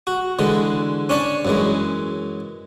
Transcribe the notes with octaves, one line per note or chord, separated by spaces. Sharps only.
F#4
D3 E3 G#3
C#4 D4 C#5 D5
F#2 E3 G#3